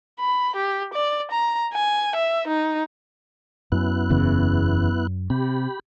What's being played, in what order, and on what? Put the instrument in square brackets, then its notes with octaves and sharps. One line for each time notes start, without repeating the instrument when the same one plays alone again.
[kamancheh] B5
G4
D5
A#5
G#5
E5
D#4
[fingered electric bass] F#2 F#3 C#4 [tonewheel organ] B3 E4 F#6
[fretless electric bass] F#1 E2 C#3
[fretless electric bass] C3 [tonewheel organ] G4 B5